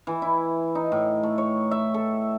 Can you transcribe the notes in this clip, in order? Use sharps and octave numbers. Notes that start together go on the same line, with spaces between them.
E3
E4
D#4
A2
A3
C#5
E5
A4